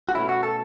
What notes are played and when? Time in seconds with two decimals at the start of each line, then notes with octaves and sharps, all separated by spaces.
0.09 F#4
0.14 B2 A3 C#4 E4
0.29 F#4
0.43 A4